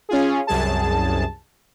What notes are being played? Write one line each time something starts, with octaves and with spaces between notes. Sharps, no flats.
C#4 F4 G#4
C2 F#2 G#4 A5